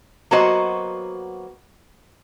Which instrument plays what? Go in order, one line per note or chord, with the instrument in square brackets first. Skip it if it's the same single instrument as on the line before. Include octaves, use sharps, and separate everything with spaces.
[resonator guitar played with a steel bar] F#3 A#3 B3 F#4 C5 D#5